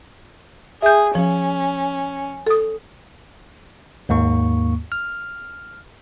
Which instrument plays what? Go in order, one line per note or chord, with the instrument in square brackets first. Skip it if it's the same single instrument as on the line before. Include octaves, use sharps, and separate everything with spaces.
[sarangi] G#4 [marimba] E5 G6
[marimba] F3 [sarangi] C#4
[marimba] A4 D#6
[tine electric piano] D#2 G#2 A#3 C#6
F6